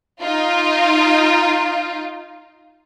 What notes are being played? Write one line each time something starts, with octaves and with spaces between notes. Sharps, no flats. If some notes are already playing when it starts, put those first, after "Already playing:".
D#4 F4